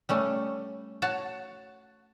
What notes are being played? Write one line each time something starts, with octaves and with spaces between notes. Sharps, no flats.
G3 A3 C#4
F#4 C#5 A5